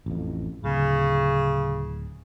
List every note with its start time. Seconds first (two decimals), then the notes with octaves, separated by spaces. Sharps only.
0.06 A1 F2
0.64 D1 C#3